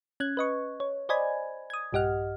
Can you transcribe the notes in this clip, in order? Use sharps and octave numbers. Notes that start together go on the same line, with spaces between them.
C#4 F#6 G#6
B4 D#5 C#6
C#5
C5 D5 D#5 G#5 B5 G#6
D#6 G#6
A#1 G2 G4 D#5 F#5 F6